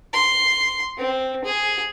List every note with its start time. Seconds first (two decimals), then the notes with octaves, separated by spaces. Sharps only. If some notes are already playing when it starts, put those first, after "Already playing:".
0.13 C6
0.98 C4
1.44 G#4